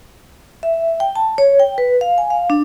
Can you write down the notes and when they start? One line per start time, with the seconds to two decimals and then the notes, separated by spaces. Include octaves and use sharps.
0.63 E5
1.00 G5
1.16 A5
1.38 C#5
1.60 G5
1.78 B4
2.01 F5
2.18 G#5
2.30 F5
2.50 D4